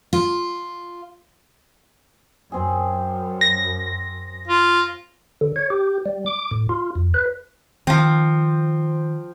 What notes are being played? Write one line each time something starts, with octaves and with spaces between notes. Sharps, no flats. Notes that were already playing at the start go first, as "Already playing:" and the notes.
F4
F#2 C4 G#4
A#6
F4
D3
C#5
G4
G3
D6
A2
F4
F2
B4
D#3 F3 C4